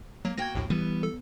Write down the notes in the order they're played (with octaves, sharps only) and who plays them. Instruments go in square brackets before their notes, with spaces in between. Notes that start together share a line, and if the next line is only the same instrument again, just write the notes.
[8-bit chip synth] F#3 [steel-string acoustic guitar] A#3
[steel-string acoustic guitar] A#3 F#4 G5 [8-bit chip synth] G#6 A#6
[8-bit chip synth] A#1 D#2 A2
[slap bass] E3 G3 [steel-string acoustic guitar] B3
[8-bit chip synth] A4